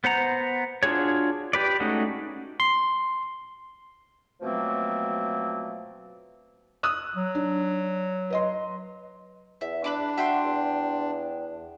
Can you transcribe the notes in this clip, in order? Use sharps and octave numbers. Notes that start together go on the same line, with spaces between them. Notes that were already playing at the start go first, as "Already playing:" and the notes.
B3 C5 F#5 A#5
D4 F4 F#4 G#4 C#5
G4 B4 D5
G#3 A3 C#4 D#4 F#4
C6
B2 F3 F#3 A3 A#3 C4
D#6 E6 F#6
F#3
D4
B4 D#5 C6
E2 E5
D4 B4 B5 D6
F#4 E5 G5 C6
E2